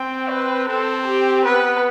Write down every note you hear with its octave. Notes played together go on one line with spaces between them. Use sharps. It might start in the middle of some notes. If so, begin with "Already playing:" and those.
Already playing: C4 G5
B4
C4 A4
G4
B3 B4